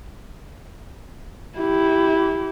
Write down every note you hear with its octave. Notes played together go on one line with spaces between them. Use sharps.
E4 G4